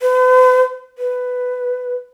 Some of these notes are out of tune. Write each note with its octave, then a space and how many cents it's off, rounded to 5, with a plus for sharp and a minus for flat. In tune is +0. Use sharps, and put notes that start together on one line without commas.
B4 +45
B4 +10